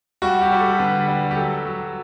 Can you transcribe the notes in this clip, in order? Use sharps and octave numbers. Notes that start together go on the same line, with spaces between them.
G3 F#4
G4
G3
A4
D3 B4
G3
G4
F#3 A4
F#3